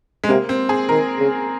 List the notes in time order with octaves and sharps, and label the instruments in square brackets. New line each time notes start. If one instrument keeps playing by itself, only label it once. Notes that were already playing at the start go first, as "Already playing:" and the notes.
[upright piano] G#3
[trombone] C3 [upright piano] A#3
[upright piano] C4
G#4
[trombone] D#3 [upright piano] A#4
[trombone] C#3